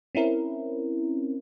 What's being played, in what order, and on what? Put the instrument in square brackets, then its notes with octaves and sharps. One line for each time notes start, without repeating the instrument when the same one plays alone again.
[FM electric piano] C4 C#4 E4 A#4